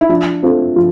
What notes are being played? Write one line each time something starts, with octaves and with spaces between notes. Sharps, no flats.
E4
F3 D4
C4 F4 A4
F3